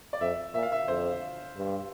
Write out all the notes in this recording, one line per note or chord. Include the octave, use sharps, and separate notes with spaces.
D5
F2 E5
A#2 E5
F5
E5
F2 C5
G2